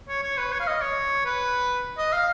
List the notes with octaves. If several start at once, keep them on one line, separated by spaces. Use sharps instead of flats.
C#5
C#5
B4
C#5
F5
D#5
C#5
B4
D#5
F5